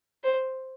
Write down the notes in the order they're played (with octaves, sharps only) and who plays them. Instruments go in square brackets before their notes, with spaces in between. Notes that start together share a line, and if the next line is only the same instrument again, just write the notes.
[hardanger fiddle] C5